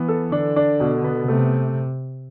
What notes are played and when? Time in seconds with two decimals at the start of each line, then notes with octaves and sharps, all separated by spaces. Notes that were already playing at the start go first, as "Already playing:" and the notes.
Already playing: E3 B3
0.09 A4
0.32 D3 D4
0.56 D4
0.80 B2
1.04 B3
1.28 C3 A3